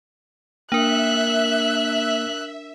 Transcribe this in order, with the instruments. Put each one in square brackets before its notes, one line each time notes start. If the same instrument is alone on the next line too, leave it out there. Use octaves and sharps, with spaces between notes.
[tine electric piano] A#3 [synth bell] D4 A#4 [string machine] E5 [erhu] F#6